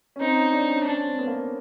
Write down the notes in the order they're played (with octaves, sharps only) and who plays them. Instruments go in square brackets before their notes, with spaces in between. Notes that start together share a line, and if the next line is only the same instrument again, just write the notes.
[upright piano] C#4
[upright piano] C4 [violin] D#4
[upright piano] C#4
D4
C#4
[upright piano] C#4 [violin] D4
[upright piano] C4
B3
A#3